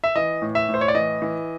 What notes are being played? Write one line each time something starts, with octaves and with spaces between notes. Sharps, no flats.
E5
E3 D#5
A2
E5
A2
C5
C#5
D5
E3 D#5
E3